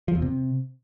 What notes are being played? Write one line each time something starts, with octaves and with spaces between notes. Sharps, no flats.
F3
E2
C3